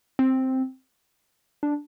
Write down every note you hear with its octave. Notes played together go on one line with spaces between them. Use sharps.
C4
D4